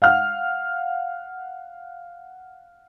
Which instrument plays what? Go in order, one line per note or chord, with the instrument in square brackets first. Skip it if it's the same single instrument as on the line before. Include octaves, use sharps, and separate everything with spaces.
[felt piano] F5 F#5 F6